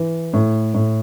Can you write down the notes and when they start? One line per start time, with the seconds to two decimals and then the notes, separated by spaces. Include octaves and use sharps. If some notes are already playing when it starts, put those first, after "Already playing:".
Already playing: E3
0.33 A2
0.74 A2